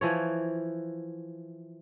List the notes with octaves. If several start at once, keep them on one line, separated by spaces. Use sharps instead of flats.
E3 F3 C#5